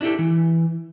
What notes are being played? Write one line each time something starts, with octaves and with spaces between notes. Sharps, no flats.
D4 E4 F#4 G4 A4
E3